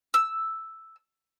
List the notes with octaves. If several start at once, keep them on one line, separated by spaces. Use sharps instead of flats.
E6